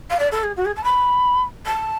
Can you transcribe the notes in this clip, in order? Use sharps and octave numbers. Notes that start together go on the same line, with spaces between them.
F5
D5
A4
G#4
F#4
G#4
A5
B5
A5